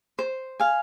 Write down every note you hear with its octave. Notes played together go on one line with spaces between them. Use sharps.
C5
F5 G#5